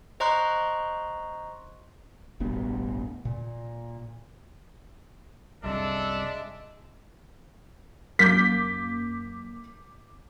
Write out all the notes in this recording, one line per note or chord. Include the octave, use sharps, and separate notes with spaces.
C5 D#5 A#5 C6 C#6 F#6
E1 A1 G2 B3
A#2
C2 F#2 G#3 D4 A4 E5
F#2 A#3 D6 G6 B6